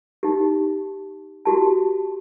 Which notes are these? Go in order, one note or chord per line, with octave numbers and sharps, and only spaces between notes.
D#4 G4
F#4 G4 A5